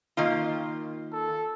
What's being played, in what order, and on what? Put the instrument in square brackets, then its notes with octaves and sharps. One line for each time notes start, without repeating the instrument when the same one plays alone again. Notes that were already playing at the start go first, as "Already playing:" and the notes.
[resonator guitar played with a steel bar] D#3 A#3 F4
[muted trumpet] A4